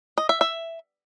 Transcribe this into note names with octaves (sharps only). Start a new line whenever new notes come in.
D#5
E5
E5